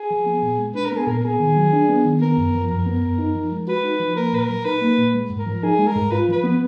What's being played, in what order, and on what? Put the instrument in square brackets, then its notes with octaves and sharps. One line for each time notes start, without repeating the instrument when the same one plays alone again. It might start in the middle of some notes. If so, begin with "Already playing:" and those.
Already playing: [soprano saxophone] G#4
[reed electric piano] F3
B3
A#2
G#3
[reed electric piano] D4 [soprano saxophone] B4
[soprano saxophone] A#4
[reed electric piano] B3 [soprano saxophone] G#4
[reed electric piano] A#2 [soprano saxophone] A#4
[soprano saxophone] A#4
[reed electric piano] B3 [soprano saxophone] G#4
[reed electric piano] D#3
F#3
D4
B3
D#3
[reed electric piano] B3 [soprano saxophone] A#4
[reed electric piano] F#2
F3
[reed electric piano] F#2 [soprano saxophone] A#4
[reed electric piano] B3
F#2
D#4
F3
G#3
[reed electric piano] F#4 [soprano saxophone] B4
[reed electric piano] D#4
F3
[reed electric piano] A#3 [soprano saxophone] A#4
[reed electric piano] A#2 [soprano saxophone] B4
[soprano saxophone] A#4
[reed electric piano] F#3
[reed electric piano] D#4 [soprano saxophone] B4
[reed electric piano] A#3
A#2
G#3
G#2
[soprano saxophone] A#4
[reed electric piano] F3
[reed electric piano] D#4 [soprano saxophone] G#4
[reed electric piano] G#3
[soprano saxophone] A#4
[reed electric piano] G#2
[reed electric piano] F4 [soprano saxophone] B4
[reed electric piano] F3 [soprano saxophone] B4
[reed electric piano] B3